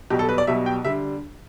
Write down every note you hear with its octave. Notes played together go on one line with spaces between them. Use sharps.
B1 B2 G3 G4
A4
B4
D5
B1 B2 G3 E5
G5
D3 G3 E5